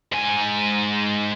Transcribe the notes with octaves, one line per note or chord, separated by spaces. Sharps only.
G#2 G#5